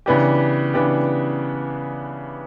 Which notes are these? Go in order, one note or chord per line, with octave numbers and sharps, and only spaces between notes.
C#3 E3 B3 D4 G4
C#3 E3 B3 D4 G4